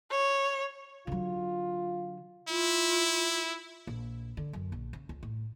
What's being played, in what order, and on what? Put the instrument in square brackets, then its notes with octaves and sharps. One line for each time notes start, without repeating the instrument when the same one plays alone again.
[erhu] C#5
[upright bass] D3 F#3 [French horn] F4
[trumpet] E4 [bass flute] F4
[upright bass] A#1
D3
F#2
A#1
C#3
C#2
A2